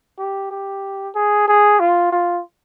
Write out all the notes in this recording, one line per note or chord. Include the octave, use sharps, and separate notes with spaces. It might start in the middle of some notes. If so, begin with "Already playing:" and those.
G4
G4
G#4
G#4
F4
F4